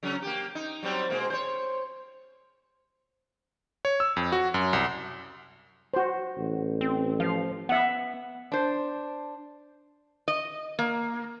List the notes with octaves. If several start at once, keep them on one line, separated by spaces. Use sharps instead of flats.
C#3 F#3 C#4
A#3 G4
D#4
F#3 G3 C4
B2 G#3 A#3
C5 C#5
C#5
E6
F2
F#4
F#2
C2
F#4 C5
A1
C4
F3 F5
B3 E5 F#5
D4 C5
D#5
A#3